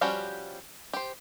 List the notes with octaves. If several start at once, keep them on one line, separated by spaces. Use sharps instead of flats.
F3 G3 C#4 F#4 G4
G4 C5